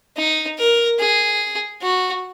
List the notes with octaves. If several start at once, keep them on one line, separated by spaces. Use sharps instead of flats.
D#4
A#4
G#4
F#4